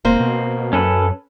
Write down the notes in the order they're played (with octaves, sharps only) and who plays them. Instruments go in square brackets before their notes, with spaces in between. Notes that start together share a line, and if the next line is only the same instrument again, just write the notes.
[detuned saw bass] E1 [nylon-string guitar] A#3 C4 C5
[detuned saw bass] B2
[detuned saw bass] F#2 [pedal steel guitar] C#4 A4 B4